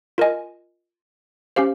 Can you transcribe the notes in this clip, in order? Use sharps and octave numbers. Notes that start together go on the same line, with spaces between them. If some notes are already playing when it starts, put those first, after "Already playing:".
F4 A#4 D#5 G#5
C#4 G4 C5 F5